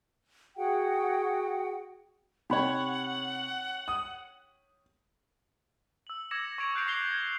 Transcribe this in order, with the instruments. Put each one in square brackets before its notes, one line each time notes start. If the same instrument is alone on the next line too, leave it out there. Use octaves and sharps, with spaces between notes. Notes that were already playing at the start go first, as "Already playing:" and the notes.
[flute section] F#4 G#4 F#5 G5
[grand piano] C3 [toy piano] D#4 B5 [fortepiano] G4 C#5 [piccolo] F#5
[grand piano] D#6
[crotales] E6 F#7
D6 E6 G#6 A#6 C#7 E7
C#6 G#6 A#6 D7 F7
C#6 F#6 G6 C7 D7 F7
D6 A#6 C7 F7 G7
G#6